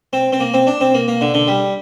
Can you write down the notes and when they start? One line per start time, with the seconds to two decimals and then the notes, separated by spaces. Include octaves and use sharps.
0.13 C4
0.32 C4
0.40 A#3
0.54 C4
0.67 D4
0.81 C4
0.94 A#3
1.08 A#3
1.21 D3
1.34 D3
1.48 G3